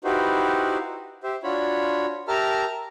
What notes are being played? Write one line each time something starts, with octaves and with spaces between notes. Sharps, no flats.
D#4 E4 F#4 G4 B4 C5
G4 C5 E5
D4 F4 F#4 C#5 B5
G4 A#4 E5 A5 A#5 F6